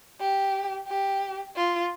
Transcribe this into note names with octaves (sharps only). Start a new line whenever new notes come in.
G4
G4
F4